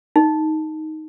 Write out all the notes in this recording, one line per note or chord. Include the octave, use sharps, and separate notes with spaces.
D#4